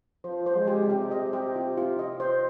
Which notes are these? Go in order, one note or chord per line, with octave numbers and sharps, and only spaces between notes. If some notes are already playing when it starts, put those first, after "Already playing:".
F3 C5
C5
G#3
G4
C3 G4
D#5
G4
F4
F4
D#5
C5